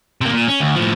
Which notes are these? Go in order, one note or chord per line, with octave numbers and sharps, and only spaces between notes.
C3 A#3
A#2
C#4
D2
A2 F3